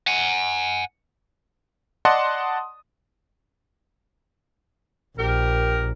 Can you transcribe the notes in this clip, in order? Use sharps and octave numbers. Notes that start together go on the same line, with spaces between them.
F#5 G#5
D5 D#5 F#5 A5 C6 D#6
A#1 G4 A#4